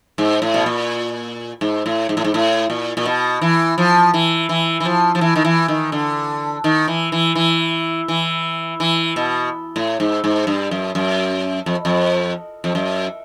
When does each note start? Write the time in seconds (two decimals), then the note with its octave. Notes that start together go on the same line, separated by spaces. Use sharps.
0.18 G#2
0.42 A2
0.54 B2
0.66 A#2
1.61 G#2
1.86 A2
2.09 G#2
2.17 A2
2.24 G#2
2.34 A2
2.70 A#2
2.97 A#2
3.05 B2
3.42 E3
3.78 F3
4.14 E3
4.49 E3
4.80 E3
4.85 F3
5.15 F3
5.21 E3
5.36 D#3
5.45 E3
5.68 D#3
5.92 D3
6.64 D#3
6.88 E3
7.12 E3
7.35 E3
8.08 E3
8.80 E3
9.16 B2
9.76 A2
10.00 G#2
10.24 G#2
10.47 G2
10.71 F#2
10.95 F#2
11.66 F2
11.85 F2
12.64 F2
12.75 F#2